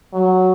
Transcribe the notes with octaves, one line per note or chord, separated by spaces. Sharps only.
F#3